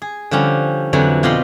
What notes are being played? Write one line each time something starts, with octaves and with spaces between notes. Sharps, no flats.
G#4
D3 F3 G3 C#4
F2 D3 E3 F#3 F#4
B2 F4 G4 D#5 B5 C6